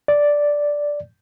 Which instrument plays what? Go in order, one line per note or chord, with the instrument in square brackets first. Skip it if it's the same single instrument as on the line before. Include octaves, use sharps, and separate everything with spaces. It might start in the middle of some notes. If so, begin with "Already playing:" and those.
[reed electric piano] D5